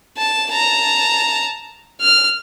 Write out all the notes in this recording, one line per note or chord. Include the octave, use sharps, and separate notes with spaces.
A5
A5 A#5
F6